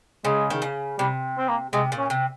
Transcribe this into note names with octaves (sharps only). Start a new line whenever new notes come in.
C#3 G#3
D#3
C#3
C3 G3
C4
A#3
C3 G#3
A#2
C#4
C3